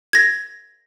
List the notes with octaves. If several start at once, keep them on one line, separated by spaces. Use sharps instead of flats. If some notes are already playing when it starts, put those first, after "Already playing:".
G#6 A#6